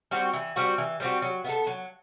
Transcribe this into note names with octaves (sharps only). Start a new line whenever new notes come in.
G3 C4 F#4
E3
G3 C4 F#4
E3
G3 C4 F#4
F#3
B3 E4 A4
F#3